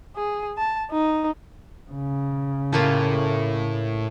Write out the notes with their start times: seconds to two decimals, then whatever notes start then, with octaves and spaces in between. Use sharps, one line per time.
0.16 G#4
0.58 A5
0.91 D#4
1.92 C#3
2.72 A2 A3 A#3 F4